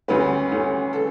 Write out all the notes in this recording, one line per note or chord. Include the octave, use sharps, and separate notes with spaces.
D2 D3 G3 C#4 B4
D2 D3 G3 C#4
C#3 E3 A4